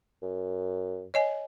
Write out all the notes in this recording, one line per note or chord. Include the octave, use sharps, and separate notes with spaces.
F#2
C#5 D#5 G#5